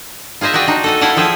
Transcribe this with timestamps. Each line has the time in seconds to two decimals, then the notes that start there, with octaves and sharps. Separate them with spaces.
0.41 F4 G#4 C5 D#5 E5
0.53 F#4 D5 D#5 G5
0.67 D4 D#4
0.84 A4 F#5 G#5
1.01 E4 A4 F5 F#5 A5
1.17 F3 G#4 E5 G5 A5